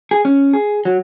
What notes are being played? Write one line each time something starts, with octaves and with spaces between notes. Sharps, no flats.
G#4
C#4
G#4
F#3